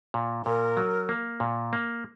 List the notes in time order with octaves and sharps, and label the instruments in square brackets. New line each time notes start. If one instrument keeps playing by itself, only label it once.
[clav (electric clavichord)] A#2
[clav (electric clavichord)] A#2 [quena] A#4
[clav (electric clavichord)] F#3
A#3
A#2
A#3